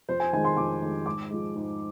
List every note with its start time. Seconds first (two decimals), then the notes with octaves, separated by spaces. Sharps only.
0.09 F2 C5
0.20 G#5
0.33 D#3 G#3 G#5
0.44 C6
0.57 F2 D6
0.82 D#3 G#3
1.06 G#2 D6
1.30 F3 G#3
1.55 G#2